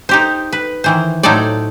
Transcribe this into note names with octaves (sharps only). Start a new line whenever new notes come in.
D#4 G4 C5
B4
D#3 E3 C5
A2 F#3 D#4 A4 C5 D5